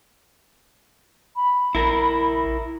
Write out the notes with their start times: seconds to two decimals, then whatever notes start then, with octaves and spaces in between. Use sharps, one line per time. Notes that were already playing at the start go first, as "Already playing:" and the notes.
1.36 B5
1.75 A#1 E4 A#4